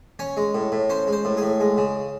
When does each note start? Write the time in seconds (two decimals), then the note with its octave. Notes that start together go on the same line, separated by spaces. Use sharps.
0.19 C#4 C#5
0.37 G#3
0.55 A2
0.72 A2
0.89 C#4 C5
1.07 G#3
1.13 C5
1.25 A2
1.37 G#4
1.42 A2
1.60 G#3
1.77 C#3